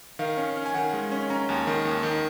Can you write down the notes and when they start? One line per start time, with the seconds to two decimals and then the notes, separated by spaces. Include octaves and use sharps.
0.19 D#3 F5
0.37 C#4
0.57 C#4
0.66 G#5
0.74 D#3 F#5
0.93 G#3
1.12 C#4
1.30 C#4 A#5
1.49 D#2
1.67 D#3
1.85 D#2
2.03 D#3